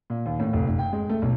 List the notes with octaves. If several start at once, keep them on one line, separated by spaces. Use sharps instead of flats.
A#2
D#2
A2
F1
F1
G5
G#3
A3
B1